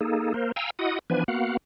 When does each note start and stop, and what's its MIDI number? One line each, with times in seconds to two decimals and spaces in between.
0.01 0.33 58
0.01 0.33 63
0.01 0.33 68
0.01 0.33 69
0.34 0.52 58
0.34 0.52 70
0.34 0.52 72
0.56 0.70 77
0.56 0.70 79
0.56 0.70 80
0.56 0.70 82
0.56 0.70 88
0.79 0.99 64
0.79 0.99 66
0.79 0.99 75
0.79 0.99 78
0.79 0.99 87
1.10 1.24 52
1.10 1.24 53
1.10 1.24 59
1.10 1.24 62
1.10 1.24 71
1.10 1.24 80
1.28 1.57 58
1.28 1.57 59
1.28 1.57 66
1.28 1.57 77
1.28 1.57 78